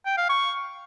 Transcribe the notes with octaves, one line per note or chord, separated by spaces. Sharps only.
G5
F5
C#6